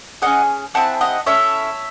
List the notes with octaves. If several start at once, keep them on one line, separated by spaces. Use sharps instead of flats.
C#4 G#4 D#5 F#5
C4 E4 G#4 F#5 A5
D#5 F#5
C#4 E4 A4 C#5 E5